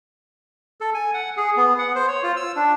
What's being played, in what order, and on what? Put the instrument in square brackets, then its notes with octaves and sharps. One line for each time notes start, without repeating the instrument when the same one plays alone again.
[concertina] A4
G#5
F#5
G#4
B3
F#5
C5
C#5
F4
E6
D4